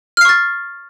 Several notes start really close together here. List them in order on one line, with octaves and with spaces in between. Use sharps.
F6 C7 C#6 A6